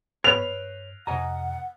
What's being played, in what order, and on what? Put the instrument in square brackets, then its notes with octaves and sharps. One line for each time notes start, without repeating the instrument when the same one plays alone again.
[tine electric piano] G2 [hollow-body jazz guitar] B4 C#5 [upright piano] F7
[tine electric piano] F2 C3 [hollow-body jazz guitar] D#5 G#5 A#5 [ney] F#5